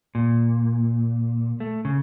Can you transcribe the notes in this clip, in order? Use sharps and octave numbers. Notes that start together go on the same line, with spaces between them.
A#2
A3
C#3